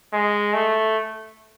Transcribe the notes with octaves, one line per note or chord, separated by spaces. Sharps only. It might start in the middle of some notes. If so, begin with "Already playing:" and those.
G#3
A3